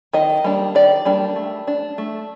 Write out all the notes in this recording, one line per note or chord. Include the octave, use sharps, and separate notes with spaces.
D#3 D#5
G3 A#3 D4
D#3 D5
G3 A#3 D4
A3
D4
A3